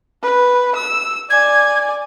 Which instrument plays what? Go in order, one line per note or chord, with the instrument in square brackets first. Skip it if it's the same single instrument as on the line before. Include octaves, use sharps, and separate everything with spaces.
[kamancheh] B4
E6
[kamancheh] D5 G#5 [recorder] G#6